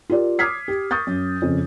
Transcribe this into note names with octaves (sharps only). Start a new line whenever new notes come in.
F4 G4 A#4 D5
D6 D#6 F6 G#6 B6 C7
G4
C#6 D#6 G6 A6
F#2
F2 C#3